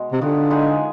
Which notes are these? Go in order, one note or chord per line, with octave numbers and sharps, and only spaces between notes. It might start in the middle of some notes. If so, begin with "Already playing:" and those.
Already playing: B2 G#3
C3
D3 D#3 B3 F4
G#3 B3 D#4 G#4